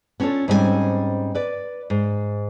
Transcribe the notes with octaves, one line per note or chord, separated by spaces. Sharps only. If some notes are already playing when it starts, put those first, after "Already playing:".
B3 C#4 D4 F4 A4 C#5
G#2 G3 C4 C#4 C5 G#5
B4 D5
G#2